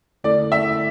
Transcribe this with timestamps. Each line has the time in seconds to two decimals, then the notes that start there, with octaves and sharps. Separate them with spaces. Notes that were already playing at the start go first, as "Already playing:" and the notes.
0.24 D3 A3 E4 A4 D5
0.52 E5